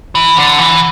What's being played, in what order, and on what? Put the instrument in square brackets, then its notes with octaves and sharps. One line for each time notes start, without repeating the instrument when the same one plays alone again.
[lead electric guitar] E3
D3
E3